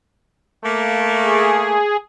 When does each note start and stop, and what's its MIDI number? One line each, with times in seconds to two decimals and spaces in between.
0.64 1.77 57
0.64 1.77 58
1.23 1.96 68